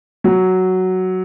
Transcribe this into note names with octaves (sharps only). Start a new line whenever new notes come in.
F#3